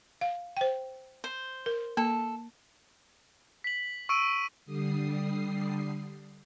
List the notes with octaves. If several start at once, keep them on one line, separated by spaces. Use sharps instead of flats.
F5
C5 G5
C5
A#4
A#3 A4
B6 F#7
C#6 E6 D7 D#7
D3 G3 D#6 C7